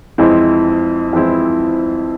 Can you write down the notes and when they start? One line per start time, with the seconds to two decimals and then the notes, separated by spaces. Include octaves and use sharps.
0.18 F2 E3 G#3 C4 E4
1.13 F2 E3 G#3 C4 E4